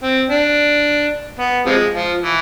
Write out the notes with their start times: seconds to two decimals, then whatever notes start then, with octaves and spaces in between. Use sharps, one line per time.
0.03 C4
0.30 D4
1.39 B3
1.66 C3 F3 G#3
1.94 F3
2.22 E3